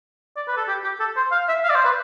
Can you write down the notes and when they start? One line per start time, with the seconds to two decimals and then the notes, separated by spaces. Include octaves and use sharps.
0.36 D5
0.48 B4
0.57 A4
0.68 G4
0.84 G4
1.00 A4
1.17 C5
1.32 F5
1.48 E5
1.64 F5
1.70 D5
1.75 C5
1.85 B4